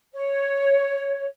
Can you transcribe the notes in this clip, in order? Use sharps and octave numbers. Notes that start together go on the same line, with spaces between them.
C#5